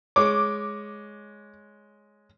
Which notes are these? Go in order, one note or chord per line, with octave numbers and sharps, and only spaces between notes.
G#3 C#5 D6